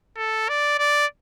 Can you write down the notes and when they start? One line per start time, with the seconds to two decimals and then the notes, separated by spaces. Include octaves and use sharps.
0.17 A4
0.49 D5
0.79 D5